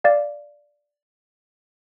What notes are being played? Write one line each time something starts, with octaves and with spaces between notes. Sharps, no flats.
D5 F5